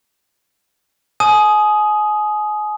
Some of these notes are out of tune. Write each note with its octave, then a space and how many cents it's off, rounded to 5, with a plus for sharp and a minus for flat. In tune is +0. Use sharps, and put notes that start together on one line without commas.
G#5 +30 D#6 +0